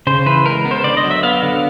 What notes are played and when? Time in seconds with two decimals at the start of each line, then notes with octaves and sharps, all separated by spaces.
0.07 C#3 C5
0.26 E3 B4
0.46 G#3 A#4
0.65 B3
0.71 C5
0.84 D3 D5
0.97 D#5
1.04 F#3
1.11 E5
1.23 B3 F5
1.43 D3